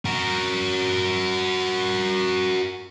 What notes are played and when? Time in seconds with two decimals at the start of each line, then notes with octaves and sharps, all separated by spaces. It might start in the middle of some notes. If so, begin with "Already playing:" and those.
0.05 F#4 A#4